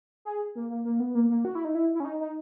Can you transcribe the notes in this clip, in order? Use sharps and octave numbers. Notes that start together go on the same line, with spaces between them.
G#4
A#3
A#3
A#3
B3
A#3
A#3
F#4
E4
D#4
E4
E4
C#4
D#4
D#4